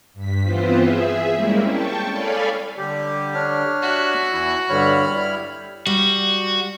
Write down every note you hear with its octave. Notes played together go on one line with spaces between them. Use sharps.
G2 B6
E3 B3 C4 F4 B4 C5
G#4 E5
G3 G#3 A#3 C4 C#4 E4
G5 A5 C#6
A4 C#5 D5 F5 G#5 B5
D3 G3 G4
D4 C#5 F6
F#4 E5
E2 E3 E4
G2 D3 G3 C#5 B5 F6
E4
G3 F#4